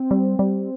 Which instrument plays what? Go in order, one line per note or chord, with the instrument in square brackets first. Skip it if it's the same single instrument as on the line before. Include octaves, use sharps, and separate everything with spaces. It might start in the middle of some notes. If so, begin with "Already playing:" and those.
Already playing: [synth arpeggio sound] C4
G3
G3